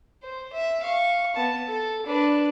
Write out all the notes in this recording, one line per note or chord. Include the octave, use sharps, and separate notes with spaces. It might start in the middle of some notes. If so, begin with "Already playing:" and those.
C5
E5
F5 C#6
B3 A5
A4
D4 B4